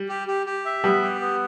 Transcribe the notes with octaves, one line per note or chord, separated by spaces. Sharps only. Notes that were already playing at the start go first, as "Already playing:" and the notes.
Already playing: G3
G4
G4
G4
E5
G3 B3
G4
B3